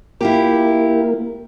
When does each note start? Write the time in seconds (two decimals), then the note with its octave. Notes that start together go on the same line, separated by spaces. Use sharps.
0.21 A#3 E4 F4 G4